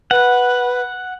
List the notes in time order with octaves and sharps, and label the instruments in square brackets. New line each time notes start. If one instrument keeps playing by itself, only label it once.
[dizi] B4 [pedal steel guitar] F#5